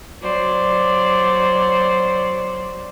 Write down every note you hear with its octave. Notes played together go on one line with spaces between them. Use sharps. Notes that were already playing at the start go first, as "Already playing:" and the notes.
F#3 C5 D5